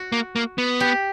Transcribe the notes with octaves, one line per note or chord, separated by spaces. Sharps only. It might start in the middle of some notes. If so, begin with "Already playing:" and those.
Already playing: F#4
A#3
A#3
B3
G4